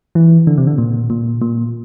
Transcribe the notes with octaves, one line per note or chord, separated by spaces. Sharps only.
E3
D3
C3
D3
A#2
A#2
A#2